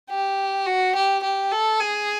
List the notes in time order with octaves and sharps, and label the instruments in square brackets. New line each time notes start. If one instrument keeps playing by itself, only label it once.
[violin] G4
F#4
G4
G4
A4
G#4